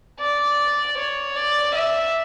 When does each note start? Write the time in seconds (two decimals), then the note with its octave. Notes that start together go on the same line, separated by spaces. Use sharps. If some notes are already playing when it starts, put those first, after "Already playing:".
0.20 D5
0.97 C#5
1.36 D5
1.74 E5